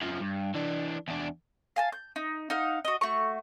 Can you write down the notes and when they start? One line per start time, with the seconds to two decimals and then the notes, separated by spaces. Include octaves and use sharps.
0.02 F#2 F3
0.20 G2
0.55 E3 D4
1.08 E2 D4
1.76 F5 G#5 A5
1.92 G6
2.16 D#4
2.50 D#4 F5 F#5
2.85 F#4 D#5
3.01 A3 F#4 C#6